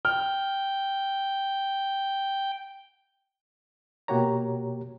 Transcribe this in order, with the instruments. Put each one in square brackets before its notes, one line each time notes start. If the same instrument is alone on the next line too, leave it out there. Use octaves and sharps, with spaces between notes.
[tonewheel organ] G5 [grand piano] F6
[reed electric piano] B2 A#3 F#4 G4 C#5 A#5